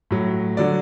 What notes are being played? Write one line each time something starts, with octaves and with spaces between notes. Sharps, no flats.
A2 F#3
D3 F#3 D5